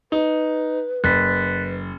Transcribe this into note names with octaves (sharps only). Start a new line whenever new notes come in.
D#4 B4
F#1 F#6 A6 B6